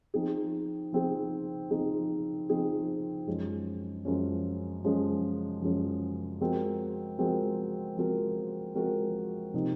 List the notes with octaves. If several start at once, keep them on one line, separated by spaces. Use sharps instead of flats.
F3 C4 D#4 G#4
F3 C4 D#4 G#4
F3 C4 D#4 G#4
F3 C4 D#4 G#4
F#2 F3 G#3 C#4
F#2 F3 G#3 C#4
F#2 F3 G#3 C#4
F#2 F3 G#3 C#4
F3 G#3 C4 F#4 A#4
F3 G#3 C4 F#4 A#4
F3 G#3 C4 F#4 A#4
F3 G#3 C4 F#4 A#4
C3 F3 C4 D#4